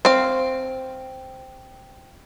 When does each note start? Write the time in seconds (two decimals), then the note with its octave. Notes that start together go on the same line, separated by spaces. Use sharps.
0.05 C4 F5